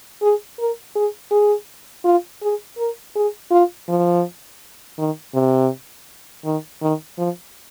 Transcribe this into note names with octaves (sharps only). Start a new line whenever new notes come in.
G#4
A#4
G#4
G#4
F4
G#4
A#4
G#4
F4
F3
D#3
C3
D#3
D#3
F3